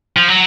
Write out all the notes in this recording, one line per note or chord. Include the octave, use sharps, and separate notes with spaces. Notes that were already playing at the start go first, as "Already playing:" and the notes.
F3
F#3